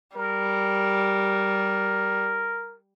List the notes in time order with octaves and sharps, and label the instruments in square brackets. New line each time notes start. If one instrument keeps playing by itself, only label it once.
[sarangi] G3 [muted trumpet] A#4